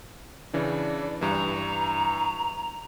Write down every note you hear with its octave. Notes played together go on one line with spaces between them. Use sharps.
C#3 E3 D4 D5
G2 E3 A#5